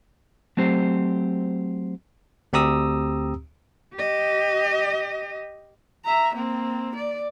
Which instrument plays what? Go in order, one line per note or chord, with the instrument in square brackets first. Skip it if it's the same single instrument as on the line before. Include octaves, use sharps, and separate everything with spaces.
[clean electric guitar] F#3 A3 C4 G4 C5
[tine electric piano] D2 C4 G4 A#5 D#6 E6
[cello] G4 D#5
[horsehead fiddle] E5 A#5
A#3 C4
D5